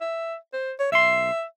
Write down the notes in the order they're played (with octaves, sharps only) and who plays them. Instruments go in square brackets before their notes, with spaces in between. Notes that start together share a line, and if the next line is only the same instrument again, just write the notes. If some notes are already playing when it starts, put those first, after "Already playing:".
[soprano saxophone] E5
C5
C#5
[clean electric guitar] B1 C6 [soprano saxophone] E5